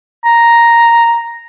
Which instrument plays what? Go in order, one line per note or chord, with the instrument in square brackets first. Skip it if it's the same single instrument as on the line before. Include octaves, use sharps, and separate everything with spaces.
[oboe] A#5